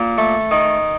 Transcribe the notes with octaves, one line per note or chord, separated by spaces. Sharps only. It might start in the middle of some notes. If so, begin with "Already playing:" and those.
Already playing: A#2
A3
D#3